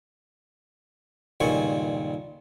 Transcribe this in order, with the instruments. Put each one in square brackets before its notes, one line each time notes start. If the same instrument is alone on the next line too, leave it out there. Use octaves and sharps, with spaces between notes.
[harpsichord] C#2 G2 A#2 D#3 G#5 C#6